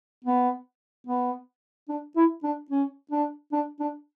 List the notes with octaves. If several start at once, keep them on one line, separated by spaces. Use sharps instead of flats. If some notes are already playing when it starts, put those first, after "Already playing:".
B3
B3
D4
E4
D4
C#4
D4
D4
D4